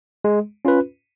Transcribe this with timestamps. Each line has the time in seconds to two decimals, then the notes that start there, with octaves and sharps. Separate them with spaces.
0.24 G#3
0.65 C#4 F4 B4